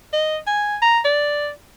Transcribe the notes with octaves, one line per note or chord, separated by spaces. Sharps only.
D#5
G#5
A#5
D5